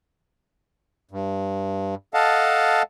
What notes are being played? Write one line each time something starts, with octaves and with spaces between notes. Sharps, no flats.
G2
A4 D#5 F5 F#5 A5